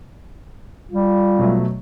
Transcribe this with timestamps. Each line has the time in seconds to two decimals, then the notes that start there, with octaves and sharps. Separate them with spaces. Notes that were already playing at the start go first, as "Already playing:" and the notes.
0.91 G3 F4
1.39 B2 F#3 A3